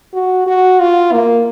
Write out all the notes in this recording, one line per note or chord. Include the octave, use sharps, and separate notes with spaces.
F#4
F#4
F4
A#3